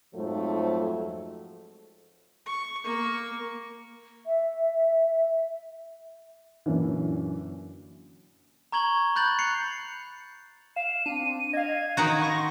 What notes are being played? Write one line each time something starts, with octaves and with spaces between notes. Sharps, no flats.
F2 G#2 F3 F#3 A3
C#6
A#3 C#6
E5
F#2 A#2 D3 E3
A#5 C#6 G#6 F#7 G7
B5 F#6 G6 A6 F#7
F#6 C7 C#7 F7
F5 E7
C4 D4 D#7
D#5 F5 G#6
D#3 D#4 F#4
F#5 B5 C#6 A#6
C6